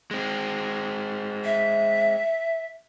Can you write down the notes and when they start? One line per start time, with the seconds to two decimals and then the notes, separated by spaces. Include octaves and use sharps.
0.11 G#3 C4
1.45 E5